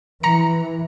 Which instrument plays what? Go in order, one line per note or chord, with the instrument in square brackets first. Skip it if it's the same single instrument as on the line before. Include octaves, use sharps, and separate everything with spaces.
[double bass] E3 [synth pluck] A#5 C#7